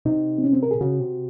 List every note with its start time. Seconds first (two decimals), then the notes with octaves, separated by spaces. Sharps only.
0.05 C3 D#4
0.38 C4
0.44 C#4
0.53 C4
0.63 A#4
0.71 G#4
0.81 C#3 F#4
1.00 C3